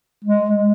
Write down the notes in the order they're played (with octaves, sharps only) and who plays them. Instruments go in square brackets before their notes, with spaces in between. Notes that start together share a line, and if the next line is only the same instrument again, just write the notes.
[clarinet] G#3